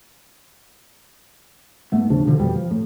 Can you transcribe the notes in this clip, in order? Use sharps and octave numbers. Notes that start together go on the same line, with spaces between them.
G#2 A3 B3
D#2 C#3 F3 D4
B2 D3 F3
F2 B2 F3 G3
F3
A2